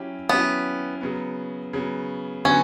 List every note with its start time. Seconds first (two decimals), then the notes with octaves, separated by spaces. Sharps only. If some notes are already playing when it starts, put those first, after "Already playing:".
Already playing: F#3 C#4 E4 G4
0.29 F#3 B3 C#4 E4 G4
1.01 C#3 F#3 B3
1.73 C#3 F#3 B3
2.45 D3 F#3 B3 C#4 F#4